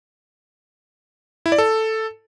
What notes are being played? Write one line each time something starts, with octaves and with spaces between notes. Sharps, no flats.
E4
D5
A4